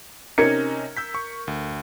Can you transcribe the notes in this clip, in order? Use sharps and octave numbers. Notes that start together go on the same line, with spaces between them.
C3 C#4 D#4 A#4 G#6 C#7
E6 G6 B6
C#6
D2